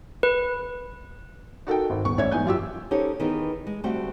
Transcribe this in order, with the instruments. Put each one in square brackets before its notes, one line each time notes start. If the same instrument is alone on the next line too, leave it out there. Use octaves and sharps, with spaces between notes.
[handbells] B4
[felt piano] D#4 F#4 A4 A#4 G5
G#1
D#1 B3 C#6
A1 C#4 C#5 D5 E5 G#6
G#2 E3 B3 D#4 G#5 G6
F#2 F4 G4 E6
[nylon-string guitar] C#4 D#4 G4 A4 C5 C#5
D#3 E3 B3 D#4 G#4
G#3
D2 G3 A3 C4 F#4 G5